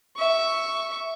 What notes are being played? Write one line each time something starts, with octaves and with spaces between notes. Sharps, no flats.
E5 C#6